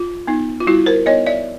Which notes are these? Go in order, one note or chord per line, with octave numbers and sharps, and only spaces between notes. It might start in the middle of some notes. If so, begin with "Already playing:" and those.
Already playing: F4
B3 D#4
F4
G3 E4 F#4
A#4 C5
B3 D#4 C#5 D#5
D5 E5